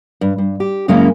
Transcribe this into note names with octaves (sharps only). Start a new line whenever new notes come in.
G2
G2
G4
F#2 C#3 G#3 A#3 C#4 E4